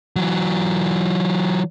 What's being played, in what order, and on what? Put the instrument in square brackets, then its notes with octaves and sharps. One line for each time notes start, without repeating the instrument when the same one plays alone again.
[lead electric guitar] E3 F#3